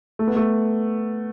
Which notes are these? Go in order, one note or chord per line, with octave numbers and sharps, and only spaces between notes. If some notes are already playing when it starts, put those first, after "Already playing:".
A3
B3
A3